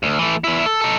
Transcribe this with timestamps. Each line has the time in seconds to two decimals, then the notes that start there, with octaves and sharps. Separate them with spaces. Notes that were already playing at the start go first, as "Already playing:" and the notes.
0.03 D2
0.19 E3 A3
0.44 E2 E4
0.66 A4
0.81 D#4 A4